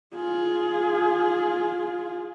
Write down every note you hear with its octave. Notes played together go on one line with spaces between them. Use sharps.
F4 G#4